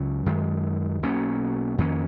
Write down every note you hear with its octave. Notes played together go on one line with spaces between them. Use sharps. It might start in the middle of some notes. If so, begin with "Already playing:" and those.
Already playing: C#2 C#3 F#3 C#4
F#2 D#3 G#3
B1 B2 A#3 C#4
F2 D#3 A#3 C#4